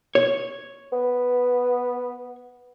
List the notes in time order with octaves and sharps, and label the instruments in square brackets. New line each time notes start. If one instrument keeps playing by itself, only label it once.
[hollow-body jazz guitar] C#5
[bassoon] B3